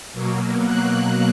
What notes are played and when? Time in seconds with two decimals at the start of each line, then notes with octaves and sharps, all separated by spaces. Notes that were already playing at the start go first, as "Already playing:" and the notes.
0.13 B2 F#3 A#3
0.64 F#6